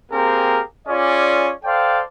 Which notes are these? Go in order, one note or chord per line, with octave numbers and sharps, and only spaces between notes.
A#3 C4 G4 G#4 A#4
C#4 F4 G#4 D5
A4 C5 D5 F5 G5